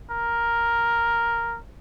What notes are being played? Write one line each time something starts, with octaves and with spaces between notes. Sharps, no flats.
A#4